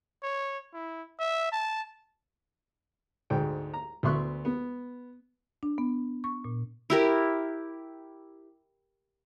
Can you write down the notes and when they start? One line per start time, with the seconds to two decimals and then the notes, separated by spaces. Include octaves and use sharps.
0.23 C#5
0.74 E4
1.19 E5
1.52 A5
3.30 D2 G#2 G5
3.74 A#5
4.03 D2 B3 E5 C6 C#6 F#6
4.45 B3
5.63 D4
5.78 B3
6.24 C#6
6.44 A#2
6.90 E4 G4 A#4